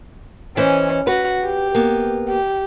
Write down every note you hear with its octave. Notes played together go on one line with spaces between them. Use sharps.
E3 C#4 C5 D#5
F#4 B4
G4
A#3 B3
G4